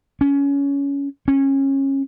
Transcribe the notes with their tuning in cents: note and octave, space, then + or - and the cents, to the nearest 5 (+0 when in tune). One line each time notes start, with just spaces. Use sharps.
C#4 +20
C#4 -25